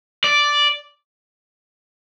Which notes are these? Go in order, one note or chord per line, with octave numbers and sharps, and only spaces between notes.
D5